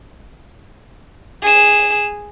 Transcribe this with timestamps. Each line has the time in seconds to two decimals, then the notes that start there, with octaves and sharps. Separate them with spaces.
1.43 G#4 E7